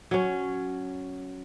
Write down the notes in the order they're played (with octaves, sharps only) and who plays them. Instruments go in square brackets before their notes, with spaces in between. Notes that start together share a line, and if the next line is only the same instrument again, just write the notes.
[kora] F#3 C#4